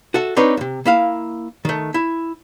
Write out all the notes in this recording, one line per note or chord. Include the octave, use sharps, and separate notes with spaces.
F#4 A4 E5
C4 D4 D#4 B4 C#5
D#2 C3
A#3 E4 F5
D#3 A3
E4